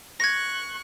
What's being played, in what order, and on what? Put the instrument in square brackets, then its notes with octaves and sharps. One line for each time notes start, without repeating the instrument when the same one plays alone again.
[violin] C#6 F#6 [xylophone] G#6 A#6